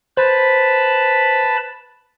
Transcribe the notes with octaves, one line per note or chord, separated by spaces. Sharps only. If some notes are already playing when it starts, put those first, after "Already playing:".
B4 C5 A5 B5